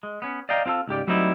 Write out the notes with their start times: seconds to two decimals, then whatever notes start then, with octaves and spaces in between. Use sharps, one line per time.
0.03 G#3
0.22 B3 C#4
0.49 D5 D#5 F5 G5 A#5
0.66 C4 F4 G#4 A4
0.88 C#2 G#2 G4 D5
1.07 F#3 G3 A3 C4 D#4 E4